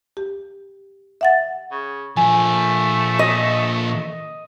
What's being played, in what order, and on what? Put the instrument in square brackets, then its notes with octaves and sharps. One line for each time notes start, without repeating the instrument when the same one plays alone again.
[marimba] G4
E5 F#5 A6
[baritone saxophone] C#3
[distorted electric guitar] A#2 F3 [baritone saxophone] A3 [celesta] G#5
[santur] D#5